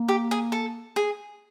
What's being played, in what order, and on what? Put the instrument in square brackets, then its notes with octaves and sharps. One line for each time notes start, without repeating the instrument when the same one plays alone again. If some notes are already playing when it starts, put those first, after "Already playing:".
Already playing: [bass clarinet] A#3
[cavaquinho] G4
G#4
A4
G#4